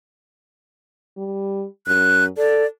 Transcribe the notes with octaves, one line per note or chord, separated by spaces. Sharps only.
G3
F#2 F#6
A4 D5